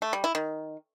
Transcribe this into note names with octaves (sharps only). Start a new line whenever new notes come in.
A3
G3
E4
D#3